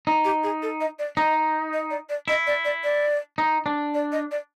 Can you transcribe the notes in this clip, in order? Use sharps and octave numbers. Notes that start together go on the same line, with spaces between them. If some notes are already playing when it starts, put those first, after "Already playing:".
D#4
G4
G#4
A4
D#5
D5
D#4 D#5
D#5
D5
D5
E4 D#5
D5
D5
D5
D#4
D4
D5
D#5
D5